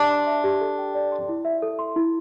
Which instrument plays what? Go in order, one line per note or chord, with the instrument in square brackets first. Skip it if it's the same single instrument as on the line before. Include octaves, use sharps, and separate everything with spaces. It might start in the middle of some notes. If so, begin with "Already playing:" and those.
Already playing: [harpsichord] D4 [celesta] G4 E5
[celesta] C6
E5
G4
A4
G5
D5
C6
E4
E5
A4
C6
E4